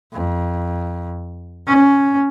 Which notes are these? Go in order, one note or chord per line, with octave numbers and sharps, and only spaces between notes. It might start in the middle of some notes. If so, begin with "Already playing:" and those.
F2
C#4